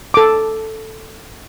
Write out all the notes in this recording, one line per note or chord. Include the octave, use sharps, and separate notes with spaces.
A4 D6